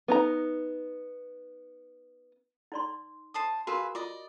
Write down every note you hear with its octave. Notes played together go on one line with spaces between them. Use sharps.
B3 D#4 A#5
D#4 D5 C6
C5 A5 D#6
F4 F#4 G#4 A#4 B4
F4 D5 D#5